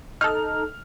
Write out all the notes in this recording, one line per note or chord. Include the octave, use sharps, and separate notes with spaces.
D#4 A4 F6